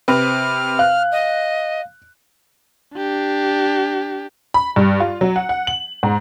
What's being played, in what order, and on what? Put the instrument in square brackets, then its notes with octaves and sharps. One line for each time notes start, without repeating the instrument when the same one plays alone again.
[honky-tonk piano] C3 C4 B4 [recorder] F6
[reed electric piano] F5 [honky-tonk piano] F#6
[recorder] D#5
[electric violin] D4 G4
[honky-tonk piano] B5
G2
F4
F#3
F#5
F#5
F#7
G#2